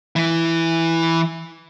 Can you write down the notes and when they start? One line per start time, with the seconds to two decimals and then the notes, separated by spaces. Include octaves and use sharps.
0.16 E3 E4